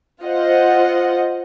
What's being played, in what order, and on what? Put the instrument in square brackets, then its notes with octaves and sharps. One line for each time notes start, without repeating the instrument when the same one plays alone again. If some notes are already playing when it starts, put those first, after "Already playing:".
[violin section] F4 C5 D#5 F#5